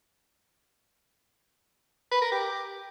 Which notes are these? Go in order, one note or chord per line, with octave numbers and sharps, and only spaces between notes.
B4
A#4
G4